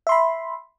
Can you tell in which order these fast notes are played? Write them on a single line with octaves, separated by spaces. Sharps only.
E5 C6 B5